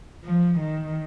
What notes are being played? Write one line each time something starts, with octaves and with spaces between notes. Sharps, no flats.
F3
D#3